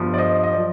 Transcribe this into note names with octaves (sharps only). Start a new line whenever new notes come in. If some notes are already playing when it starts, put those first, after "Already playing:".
Already playing: G1 G2 F3
D5
C5 D#5
D#5
F3 D5